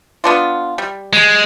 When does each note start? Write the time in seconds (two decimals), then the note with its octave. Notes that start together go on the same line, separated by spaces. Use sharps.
0.24 B3 D4 F4
0.78 G3
1.13 G#3